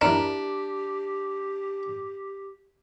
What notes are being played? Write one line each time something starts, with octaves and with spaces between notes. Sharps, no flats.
D4 E4 G4 A#4